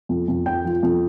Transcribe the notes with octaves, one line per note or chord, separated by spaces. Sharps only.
F2
F2
F3 G5
F3
F2